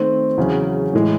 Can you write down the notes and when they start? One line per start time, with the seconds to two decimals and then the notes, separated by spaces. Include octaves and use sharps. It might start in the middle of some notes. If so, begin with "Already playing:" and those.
Already playing: D#3 A3 C4
0.37 E2 C#3 F#3 C#4
0.93 A2 E3 G#3